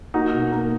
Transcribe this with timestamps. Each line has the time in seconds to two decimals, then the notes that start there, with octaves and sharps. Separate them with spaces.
0.14 A#3 D#4 F#4
0.34 B2
0.52 A#3